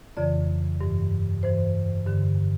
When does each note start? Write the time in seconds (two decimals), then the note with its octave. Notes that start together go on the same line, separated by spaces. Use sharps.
0.17 F2 C#3 E3 D5
0.81 G2 E3
1.43 G2 E3 C5
2.07 G2 D3